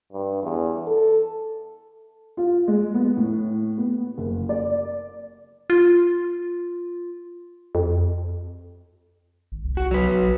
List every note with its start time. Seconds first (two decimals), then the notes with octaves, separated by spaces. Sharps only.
0.13 G2
0.43 E2
0.88 A4
2.37 F4
2.68 G#3
2.94 B3
3.17 A2
3.78 B3
4.18 F#1
4.49 D5
5.70 F4
7.75 F2
9.52 G#1
9.65 C2
9.77 F#4
9.91 F#3 B4
10.22 A#1